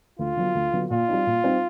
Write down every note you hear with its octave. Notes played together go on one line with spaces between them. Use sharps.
D2 F4
D3 F#3 B3
D2
D3 F#3 B3
A#2 F4
G3 C4 D#4
A#2
G3 C4 D#4